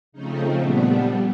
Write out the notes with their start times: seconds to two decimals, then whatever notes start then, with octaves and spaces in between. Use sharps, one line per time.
0.12 C#3 F3 A3 C4 D#4
0.60 A#2 G3 B3 D4